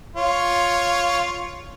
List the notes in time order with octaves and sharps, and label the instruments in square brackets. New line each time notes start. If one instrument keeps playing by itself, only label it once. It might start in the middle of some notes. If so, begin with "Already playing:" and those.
[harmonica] F4 C#5